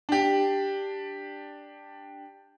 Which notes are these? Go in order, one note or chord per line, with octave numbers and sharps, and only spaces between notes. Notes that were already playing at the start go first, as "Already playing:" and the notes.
D4 G4